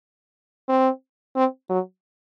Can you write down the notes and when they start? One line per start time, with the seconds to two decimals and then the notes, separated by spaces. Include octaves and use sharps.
0.69 C4
1.36 C4
1.70 F#3